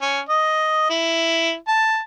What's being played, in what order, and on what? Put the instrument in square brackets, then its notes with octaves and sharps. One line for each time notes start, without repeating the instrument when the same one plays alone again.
[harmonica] C#4
D#5
E4
A5